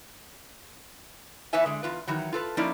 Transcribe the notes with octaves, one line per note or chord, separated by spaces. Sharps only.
E2 E3 B4 C#5 E5 G#5
D3 G#3
E2 F4 B4
D#3 E3 F#3
F4 A4 B4
F3 A#3 C#4 D#4 E4 D5